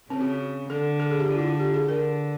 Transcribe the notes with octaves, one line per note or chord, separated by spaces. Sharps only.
C#3 C4
F#4
D3 A4
A4
G#4
G4
D3 F4
E4
F4
G4
G#4
D3 A#4